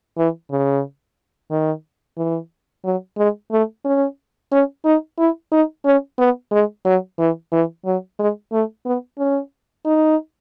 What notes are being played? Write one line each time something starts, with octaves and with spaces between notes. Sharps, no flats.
E3
C#3
D#3
E3
F#3
G#3
A3
C#4
C#4
D#4
E4
D#4
C#4
B3
G#3
F#3
E3
E3
F#3
G#3
A3
B3
C#4
D#4